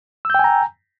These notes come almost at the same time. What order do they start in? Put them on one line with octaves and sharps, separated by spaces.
E6 G6 G5 G#5 A#5